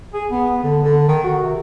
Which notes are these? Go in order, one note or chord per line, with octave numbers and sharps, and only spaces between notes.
G#4
B3
D3
D3
D#3
F#4
C3